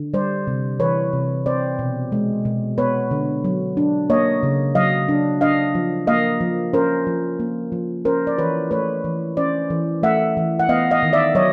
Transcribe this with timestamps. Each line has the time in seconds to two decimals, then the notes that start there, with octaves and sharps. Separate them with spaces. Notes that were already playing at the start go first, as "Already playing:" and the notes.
Already playing: D3
0.14 G3 C5 D5
0.47 C3
0.80 E3 B4 C#5
1.13 C3
1.46 C4 C5 D5
1.79 B2
2.12 G#3
2.45 B2
2.78 B3 B4 C#5
3.11 D3
3.44 F#3
3.77 D4
4.10 A#3 C#5 D#5
4.43 C#3
4.75 F#3 D#5 F5
5.09 D4
5.41 D4 D#5 F5
5.75 F3
6.07 A#3 D#5 F5
6.40 F3
6.73 C#4 A#4 C5
7.07 F3
7.40 A#3
7.72 F3
8.05 C#4 A#4 C5
8.27 D5
8.38 E3 B4 C#5
8.71 A3 B4 C#5
9.04 E3
9.37 C#4 C5 D5
9.70 E3
10.03 A3 E5 F#5
10.37 E3
10.60 F#5
10.69 B3 D#5 F5
10.91 D#5 F5
11.03 D#3
11.13 D5 E5
11.35 F#3 C#5 D#5